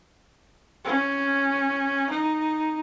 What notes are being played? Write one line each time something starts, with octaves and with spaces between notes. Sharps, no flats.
C#4
D#4